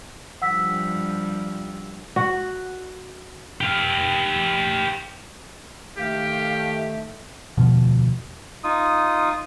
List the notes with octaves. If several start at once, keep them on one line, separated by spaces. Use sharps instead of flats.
G2 F3 G3 F#5 E6 B6
F#4
G4 F5
D#3 A3 G4 F5
E1 D2 B2 F3
D#4 F4 D#6